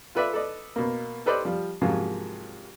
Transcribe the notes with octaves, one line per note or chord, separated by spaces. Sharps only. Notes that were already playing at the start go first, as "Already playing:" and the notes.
F4 A4 B4 D5 E5
A4 B4 D5 D#5
B2 A#3
G4 A4 B4 C5 D5 D#5
F3 G3
G#2 C3 F3 F#3 A#3 C#4